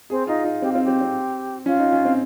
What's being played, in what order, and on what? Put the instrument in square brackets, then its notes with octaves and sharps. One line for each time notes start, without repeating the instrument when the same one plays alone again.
[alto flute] C4 [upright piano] G#4
[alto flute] D#4 [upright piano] F4
[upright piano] D#4
[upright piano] C4 [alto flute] G4
[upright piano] C4 [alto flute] F4
[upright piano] C4 [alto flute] G4
[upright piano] C4
[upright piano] C#4 [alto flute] F4
[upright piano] D#4
C#4
C4